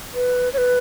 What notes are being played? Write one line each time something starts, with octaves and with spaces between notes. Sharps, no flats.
B4
C#5
B4